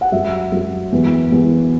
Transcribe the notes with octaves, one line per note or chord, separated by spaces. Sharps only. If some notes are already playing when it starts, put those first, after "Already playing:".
F#5
F#2 E5
F#2
E2
E2